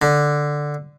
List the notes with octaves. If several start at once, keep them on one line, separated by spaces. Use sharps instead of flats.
D3